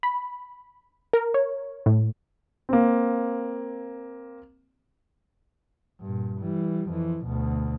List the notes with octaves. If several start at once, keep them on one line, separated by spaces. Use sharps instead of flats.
B5
A#4
C#5
A2
A#3 C4
G2 A#2
E3 G3
F2 E3
D2 B2